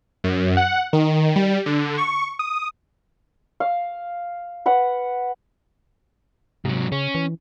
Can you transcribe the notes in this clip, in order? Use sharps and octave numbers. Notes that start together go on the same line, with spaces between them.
F#2
F#5
D#3
G3
D3
C#6
D#6
F5
B4 F#5
G#2 C3 F#3
C#3 C#4
E3